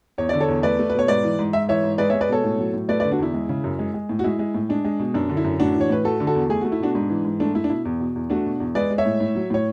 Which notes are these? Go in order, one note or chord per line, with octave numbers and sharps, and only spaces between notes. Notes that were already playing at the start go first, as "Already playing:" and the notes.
E2 C#5
D3 D5
A4 C#5
E2
A3 B4 D5
A3
B2 B4
C#5
G#2 B4 D5
E3
G#2
G#2 E5
E3 C#5 E5
G#2
G#3 B4 D5
C#5 E5
G#3
B4 D5
B2 A4 C#5
A2
F#3
A2
A3 B4 D5
B4 D5
D3
D4 F#4
E2 E4
G#3
C#3
F#2
G#3
G#3
A2
F#4
G#3 E4
G#3
A2
G#3 D4
G#3
B2
F#2 D4
D3
E4
F#2
A2 D4 F#4
E3
C#5
A2 B4
A3 F#4 A4
D3
F#4 A4
E2
A3 G#4
A3 F#4
E4
B2 D4 F#4
G#2 D4
E3
G#2
A3 D4
A3 E4
D4
B2 E4
E2
B2
E2
A3 D4 F#4
B2
E2
G#3 B4 D5
G#3
C#5 E5
A2
A2
F#3
A2 C#5